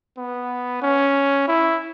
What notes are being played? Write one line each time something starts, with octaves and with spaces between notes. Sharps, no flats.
B3
C#4
E4